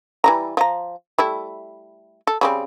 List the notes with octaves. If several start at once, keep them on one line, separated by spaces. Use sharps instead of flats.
E3 G3 A#5
F3 A#5
G3 A3 E4
A4
C#3 G3 C4